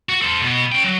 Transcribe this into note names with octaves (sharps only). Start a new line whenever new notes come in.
F#4
A4 C5
B2 B3
C#4 G5
F#3